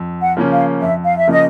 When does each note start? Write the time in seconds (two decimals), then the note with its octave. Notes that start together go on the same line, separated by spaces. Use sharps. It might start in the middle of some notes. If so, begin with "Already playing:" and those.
Already playing: F2
0.23 F#5
0.37 C#3 F3 A#3 C#4
0.52 F5
0.82 F2 E5
1.04 F5
1.17 E5
1.28 C#3 F3 A#3 C#4 D#5